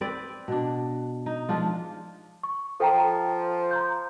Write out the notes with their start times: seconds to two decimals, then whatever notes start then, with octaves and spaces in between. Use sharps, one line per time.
0.01 C4 B4 D5
0.48 B2 D4
1.26 D#4
1.49 F3 G#3 D4 F4
2.43 C#6
2.80 F3 A4 G5 A#5
3.71 A#5 C6 G6